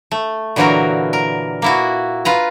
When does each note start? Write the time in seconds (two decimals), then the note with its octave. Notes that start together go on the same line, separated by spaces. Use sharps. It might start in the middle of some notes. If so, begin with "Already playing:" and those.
0.11 A3
0.56 A#2 D3 E3 F#3 F#4 A#4
1.13 A#4
1.62 A#3 E4 F#4
2.25 F4 B4 A#5